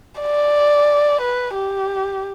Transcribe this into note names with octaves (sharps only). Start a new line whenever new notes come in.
D5
B4
G4